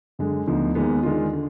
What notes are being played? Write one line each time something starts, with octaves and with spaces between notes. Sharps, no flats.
F#2 D3 G#3
D2 D3 F3 B3 D#4
D#2 D#3 G#3 B3
D#3 G#3 D4 F4
D3